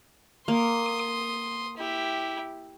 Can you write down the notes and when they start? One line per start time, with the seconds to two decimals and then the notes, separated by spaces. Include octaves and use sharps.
0.48 A#3 C6 D#6
1.76 E4 G4